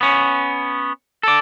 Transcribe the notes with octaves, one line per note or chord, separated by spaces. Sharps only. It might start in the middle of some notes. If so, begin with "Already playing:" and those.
B3 C#4
A4 D5